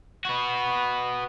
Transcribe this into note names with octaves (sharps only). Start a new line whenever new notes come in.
B3 F#4